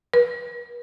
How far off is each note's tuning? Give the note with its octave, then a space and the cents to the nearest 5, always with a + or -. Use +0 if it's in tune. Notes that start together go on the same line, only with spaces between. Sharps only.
B4 -40